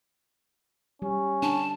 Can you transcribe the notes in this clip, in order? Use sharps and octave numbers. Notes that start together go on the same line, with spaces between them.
G3 C#4
D4 A5